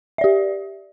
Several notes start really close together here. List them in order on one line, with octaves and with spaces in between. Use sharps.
E5 D5 G4